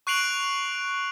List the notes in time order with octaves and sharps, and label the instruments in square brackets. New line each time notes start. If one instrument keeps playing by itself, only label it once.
[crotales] C#6 F#6 C7 D7 F7 F#7